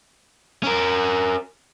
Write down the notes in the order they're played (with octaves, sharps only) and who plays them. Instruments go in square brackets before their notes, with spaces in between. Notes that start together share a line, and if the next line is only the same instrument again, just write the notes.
[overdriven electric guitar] C#4 A#4